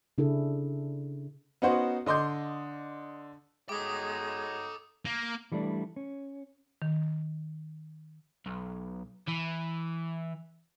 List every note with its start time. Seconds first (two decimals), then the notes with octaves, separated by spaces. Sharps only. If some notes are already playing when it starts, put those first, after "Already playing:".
0.18 C#3 D4 E4 G#4 A4
1.62 B3 C#4 D#4 F#4 C5
2.06 D3 D#5 C6 D6 G6
3.69 G#3 D#4 F#4 A4 C#5 G5 D6 D#6
5.05 A#3
5.52 E3 G3 A3 D4
5.96 C#4
6.82 D#3
8.46 B1
9.27 E3